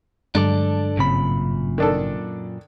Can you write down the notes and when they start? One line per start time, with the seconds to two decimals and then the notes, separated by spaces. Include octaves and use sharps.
0.35 G2 D3 F#3 G#3 D4 A4 D5
0.97 G#1 F#2 A#2 C#3 C4 B5
1.78 D#3 D4 A4